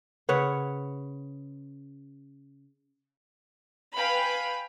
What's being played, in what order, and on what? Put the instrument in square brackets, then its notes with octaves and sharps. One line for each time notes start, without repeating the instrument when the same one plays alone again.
[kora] C#3 B4 C#5 F#5
[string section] B4 F5 G5 G#5 B5